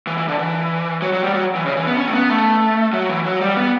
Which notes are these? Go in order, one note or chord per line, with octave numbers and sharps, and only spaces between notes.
E3
E3
D3
E3
F#3
F#3
G3
F#3
E3
C#3
E3
B3
C#4
A3
B3
A3
F#3
E3
F#3
G3
B3